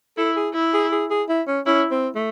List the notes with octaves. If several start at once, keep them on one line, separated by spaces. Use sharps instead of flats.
E4 A4
G#4
E4
G#4
G#4
G#4
E4
C#4
C#4 E4
C4
A3